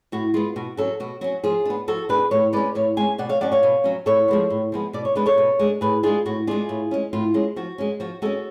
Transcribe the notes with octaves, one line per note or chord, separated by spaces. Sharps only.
A2 F#4
G#3 B3 F4
B2 F#4
F#3 C#4 F#4 A4
B2 F#4
F#3 C#4 F#4
F3 F4 G#4
B3 D4
F3 F#4 A4
B3 D4 G#4 B4
A2 A4 C#5
G#3 C#4 B4 D5
A2 C#5 F5
G#3 C#4 F5 G#5
B2 D5 F#5
C#5 F5
F#3 C#4 D5 F#5
C#5 F5
B2
F#3 C#4
A2 A4 C#5
F3 G#3 B3
A2
F3 G#3 B3
B2 D5
C#5
G#3 D4 B4
A4 C#5
B2
G#3 D4
A2 G#4 B4
G#3 D4 F4 G#4
A2 F#4
G#3 D4 F4 G#4
A2
G#3 C#4
A2 F4
G#3 C#4
F3 F#4
G#3 C#4
F3 F#4
G#3 C#4 F#4 A4